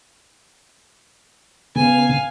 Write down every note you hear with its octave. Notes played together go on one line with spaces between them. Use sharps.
C#3 B3 F5 G#5